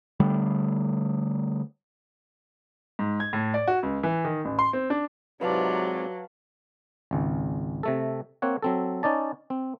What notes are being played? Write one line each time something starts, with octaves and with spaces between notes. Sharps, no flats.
D3 G3 A3
G#2
G#6
A2
D5
F#4
C#2
E3
D#3
A1
C6
C4
D4
G#2 C3 F#3 F4 B4 D5 F5 A5
G#1 C#2
C3 A3 A4
A#3 C4 C#5 F#5
F#3 C4 A4
C#4 D#4 D5 A5
C4